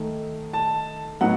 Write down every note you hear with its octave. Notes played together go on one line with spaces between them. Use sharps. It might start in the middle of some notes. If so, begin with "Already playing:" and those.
Already playing: D#3 A3 D#4
A5
A2 F#3 B3 D#4 F#5